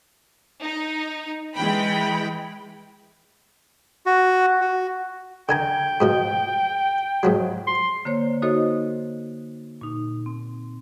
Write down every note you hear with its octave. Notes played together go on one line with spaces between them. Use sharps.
D#4
E3 G#3 G5 B5
F#4
F#4
D3 G5 G#5 A#5
G#2 B2 F3
G#2 F3 F#3
C6
D3 A#3 C5 C#5
D#4 F#4 A4 C5 C#5 D#5
A#2 D#4
C4